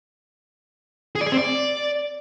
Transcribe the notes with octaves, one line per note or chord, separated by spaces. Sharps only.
G#4
D5
G#4
C4
D5